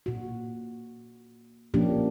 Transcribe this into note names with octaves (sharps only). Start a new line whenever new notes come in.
A#2 F#4
A#2 F3 A#3 C#4 D4 G4